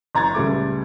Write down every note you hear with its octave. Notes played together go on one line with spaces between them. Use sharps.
F#1 A#5 G#6 A6
C#2 C#3 G3 A3 D6